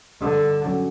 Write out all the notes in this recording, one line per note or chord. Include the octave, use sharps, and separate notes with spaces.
G2 D3
F#3 C#4 F#4